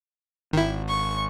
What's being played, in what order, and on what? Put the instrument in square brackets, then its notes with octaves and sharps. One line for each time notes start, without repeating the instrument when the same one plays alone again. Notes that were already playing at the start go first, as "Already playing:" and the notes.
[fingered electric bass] G#1 [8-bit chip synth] D#3 E4
[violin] C#6